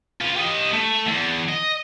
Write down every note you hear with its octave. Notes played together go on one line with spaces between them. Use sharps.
F4 B4
G4 D#5
A3
E2
D#5